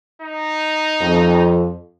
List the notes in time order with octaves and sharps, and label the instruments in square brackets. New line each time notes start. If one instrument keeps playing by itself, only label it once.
[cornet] D#4
[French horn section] F2